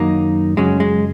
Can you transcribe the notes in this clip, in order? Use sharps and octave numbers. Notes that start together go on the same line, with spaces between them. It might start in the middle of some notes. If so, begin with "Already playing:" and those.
Already playing: F#2 D#3 F#3 A#3 D#4
F#2 C#3 F#3 G#3 C#4
G#3